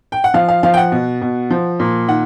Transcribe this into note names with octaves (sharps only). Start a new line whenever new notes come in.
G5
F#5
F3 F5
F5
F3 F5
G5
F#5
B2
B2
F3
A#2
D#3 F#5